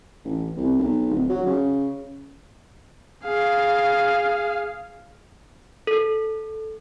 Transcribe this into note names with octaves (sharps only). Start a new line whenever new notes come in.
A1
C2
B1
D1
F#3
C#3
G#4 F5
A4